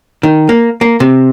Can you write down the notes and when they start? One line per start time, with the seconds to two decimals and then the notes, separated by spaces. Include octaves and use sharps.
0.23 D#3
0.49 A#3
0.81 A#3
1.00 C3